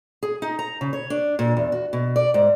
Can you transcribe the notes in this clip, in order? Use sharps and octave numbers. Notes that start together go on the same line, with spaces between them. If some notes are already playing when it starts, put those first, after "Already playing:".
G#4
D#4
A#5
C#3
C#5
D4
A#2
E2
F#4
B2
D5
G#2